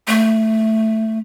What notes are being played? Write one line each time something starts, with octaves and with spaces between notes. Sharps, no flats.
A3